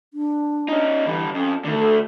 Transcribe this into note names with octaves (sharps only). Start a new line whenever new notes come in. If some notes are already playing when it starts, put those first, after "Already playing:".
D4
C#4 D#4
D3 E3 G3
F2 C#4
D3 D#3 A3
A4